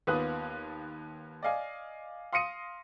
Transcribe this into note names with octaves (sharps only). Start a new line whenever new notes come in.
D#2 B3 F4 B4 D#6 F#6
D5 D#5 F5 G#5
F5 C6 D#6 A#6 C#7 D#7